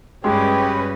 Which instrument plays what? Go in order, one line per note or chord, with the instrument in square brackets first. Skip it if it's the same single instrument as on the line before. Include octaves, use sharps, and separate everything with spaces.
[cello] G2 C#4 [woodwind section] C#3 F#4 B4 [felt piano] G#3 [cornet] G4